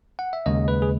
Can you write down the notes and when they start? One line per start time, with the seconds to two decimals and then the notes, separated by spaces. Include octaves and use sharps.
0.19 F#5
0.33 E5
0.46 D#2 C#3 G#3 D#5
0.68 B4
0.82 G#4